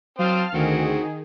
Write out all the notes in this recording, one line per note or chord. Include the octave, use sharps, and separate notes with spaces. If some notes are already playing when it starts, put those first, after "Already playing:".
F#3 C4 C5 F5 A5 D#6 F6
D2 D#3 C4 F#4 G#4